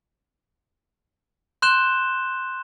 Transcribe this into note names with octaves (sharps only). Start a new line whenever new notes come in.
C6 F#6 G6 E7 G7